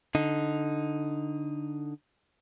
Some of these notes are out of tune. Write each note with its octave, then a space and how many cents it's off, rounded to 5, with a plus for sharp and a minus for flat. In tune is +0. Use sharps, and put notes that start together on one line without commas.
D3 +0 D#4 +0